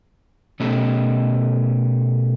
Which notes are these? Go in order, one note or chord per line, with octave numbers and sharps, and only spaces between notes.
B2 A3 C#4 D#4 G4 A4